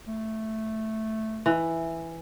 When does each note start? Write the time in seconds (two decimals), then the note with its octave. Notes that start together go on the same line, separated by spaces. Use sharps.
0.07 A3
1.46 E3